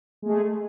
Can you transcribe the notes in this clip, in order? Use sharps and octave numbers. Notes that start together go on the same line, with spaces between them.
G#3 A3 G#4